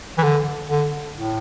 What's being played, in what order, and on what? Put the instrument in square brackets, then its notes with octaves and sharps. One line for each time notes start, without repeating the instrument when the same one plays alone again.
[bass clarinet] E3
D3
D3
A2